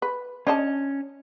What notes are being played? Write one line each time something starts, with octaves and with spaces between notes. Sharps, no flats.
B4
C#4 D4 D#5 A5